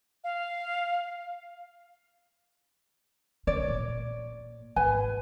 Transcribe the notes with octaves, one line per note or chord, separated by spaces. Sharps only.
F5
C#3 C#5 D5
A#2
G#1 B4 G#5